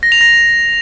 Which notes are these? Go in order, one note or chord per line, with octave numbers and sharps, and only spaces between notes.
A#6
F7
A#6